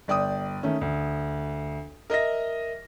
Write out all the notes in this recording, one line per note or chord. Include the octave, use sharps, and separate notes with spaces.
G1 D5 G5 D#6
D#3 A3 C#4
D2
A#4 D#5 E5 A#6